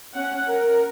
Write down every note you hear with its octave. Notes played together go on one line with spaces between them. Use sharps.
C#4 F#5
A#4